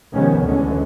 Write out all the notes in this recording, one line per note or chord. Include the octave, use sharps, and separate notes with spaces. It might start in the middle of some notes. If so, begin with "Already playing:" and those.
C3 D#3 F3 G#3 B3 C#4
D2 D3 E3 G#3 C#4